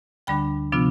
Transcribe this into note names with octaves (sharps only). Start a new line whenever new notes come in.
D2 D3 G3 D4 G5 B5
C3 F3 B3 D4 F4